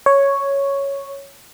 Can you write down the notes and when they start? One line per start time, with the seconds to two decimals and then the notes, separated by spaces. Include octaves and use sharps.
0.06 C#5